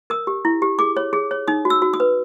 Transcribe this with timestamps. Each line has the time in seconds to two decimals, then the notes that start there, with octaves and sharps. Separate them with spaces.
0.10 A#4 D#6
0.27 G4
0.45 E4
0.62 G4
0.79 G#4 D6
0.97 C#5
1.13 G#4
1.31 C#5
1.48 D#4 D#6
1.65 F#4
1.70 E6
1.82 F#4
1.94 D#6
2.00 B4